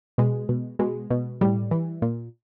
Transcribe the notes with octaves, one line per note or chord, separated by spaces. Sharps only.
B2 G#3
B2
B2 G#3
B2
A2 G3
E3
A#2